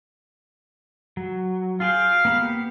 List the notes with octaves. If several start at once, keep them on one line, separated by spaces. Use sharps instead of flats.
F#3
F4 G#4 F5 G5
A#3 B3 G4